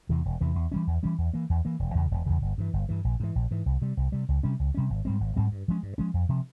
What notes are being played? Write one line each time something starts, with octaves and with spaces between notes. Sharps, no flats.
E2 C3 E3
E1
E2 C3 E3
E2
E3 G3 C#4
E2
E3 G3 C#4
E2
E3 A#3
E2
E3 A#3
E1
E2 C#3
E1
E2 C#3
G1
G2 E3
G1
G2 E3
A#1
G#2 E3
A#1
G#2 E3
C2
C3 G3
C2
C3 G3
C#2
C3 G3 C#4
C#2
C3 G3 C#4
G#1
G#2 G3 C4
G#1
G#2 G3 C4
G2
F3 G#3 C#4
G2
F3 G#3 C#4
F2
C3 F3